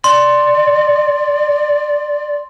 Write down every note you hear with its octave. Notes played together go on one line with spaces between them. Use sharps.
D5 C6